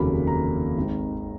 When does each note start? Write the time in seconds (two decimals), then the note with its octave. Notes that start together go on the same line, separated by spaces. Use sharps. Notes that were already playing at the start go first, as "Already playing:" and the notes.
Already playing: F1 D#2 C#3 F#3 A#3 B5
0.27 A#5
0.77 G#1 G#2 D#3